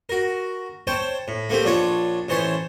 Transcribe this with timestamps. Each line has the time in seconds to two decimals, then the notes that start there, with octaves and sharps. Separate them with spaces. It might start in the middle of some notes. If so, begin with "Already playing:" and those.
0.09 F#4 A#4
0.87 C5 C#5 G5 A5
1.28 A2
1.49 A3 A#3 C4 G4
1.65 A#1 D4 F4 C#5 A5
2.28 A1 E3 C5 C#5 A5 C6